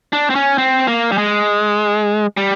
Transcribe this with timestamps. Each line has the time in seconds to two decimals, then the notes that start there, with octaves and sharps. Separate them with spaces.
0.13 D4
0.30 C4
0.35 C#4
0.58 C4
0.88 A#3
1.12 G3
1.18 G#3
2.37 G3